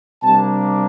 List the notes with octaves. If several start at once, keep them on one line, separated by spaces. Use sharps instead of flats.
C3 G3 A#3 D4 A5